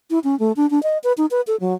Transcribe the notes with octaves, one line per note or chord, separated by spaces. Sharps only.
E4
C#4
A3
D4
D4
D#5
B4
D#4
B4
A4
F#3